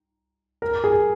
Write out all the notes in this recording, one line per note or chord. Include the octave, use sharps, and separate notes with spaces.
A#4
G#4